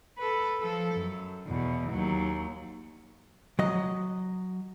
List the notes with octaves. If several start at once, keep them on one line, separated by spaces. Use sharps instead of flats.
A4 B4
F3 A4
F#2
E2 B2
D#2 F#3
F#3 D#5